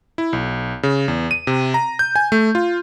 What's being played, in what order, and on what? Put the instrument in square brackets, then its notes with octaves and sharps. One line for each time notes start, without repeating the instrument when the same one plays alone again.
[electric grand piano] E4
B1
C#3
E2
D#7
C3
A#5
G6
G#5
A3
F4